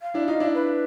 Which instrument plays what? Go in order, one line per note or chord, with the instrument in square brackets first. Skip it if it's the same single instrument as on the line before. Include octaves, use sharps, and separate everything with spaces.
[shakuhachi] F5
[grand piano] D4 E4
D#4 F4
D4 E4
[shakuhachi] B4